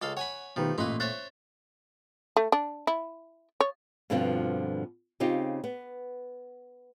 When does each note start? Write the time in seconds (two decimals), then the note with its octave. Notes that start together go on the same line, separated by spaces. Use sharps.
0.02 C#2 A4 F5
0.17 C#5 F#5 G#5 B5
0.56 B2 D#3 F3 A3 G4 B4
0.78 A1 A#2 A3 D#4 F4 B4 C6
1.00 C5 C#5 E5 F#6 A6
2.37 A3
2.52 D4
2.87 E4
3.60 C#5
4.10 G2 B2 D3 F3 C4 F4
5.20 C#3 C4 D#4 F4 G4
5.64 B3